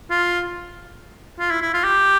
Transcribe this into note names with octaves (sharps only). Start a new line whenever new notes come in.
F4
F4
E4
E4
F4
G4